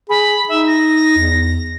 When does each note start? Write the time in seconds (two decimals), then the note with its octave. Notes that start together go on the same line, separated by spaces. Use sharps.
0.09 G#4 B5
0.49 D#4 E5
0.67 A#6
1.17 E2